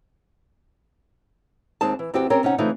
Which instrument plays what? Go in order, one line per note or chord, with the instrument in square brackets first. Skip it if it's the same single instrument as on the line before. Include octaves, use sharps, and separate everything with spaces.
[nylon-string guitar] D#2 G#3 C4 D#4 G#4 A5
E3
E2 C4 F#4 G4 G5
C4 C#4 G4 A#4 C#5 G5
C3 C#4 D#4 F#5
C#3 E3 A3 C4 D#4 F4